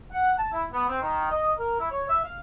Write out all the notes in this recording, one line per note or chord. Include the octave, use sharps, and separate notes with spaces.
F#5
A5
E4
B3
C4
D#3
D#5
A#4
E4
C#5
E5
F5